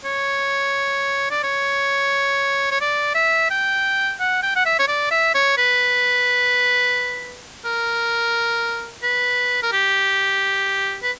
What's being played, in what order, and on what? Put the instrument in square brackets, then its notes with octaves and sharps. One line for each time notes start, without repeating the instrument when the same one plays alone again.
[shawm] C#5
D5
C#5
C#5
D5
E5
G5
F#5
G5
F#5
E5
C#5
D5
E5
C#5
B4
A#4
B4
A#4
G4
B4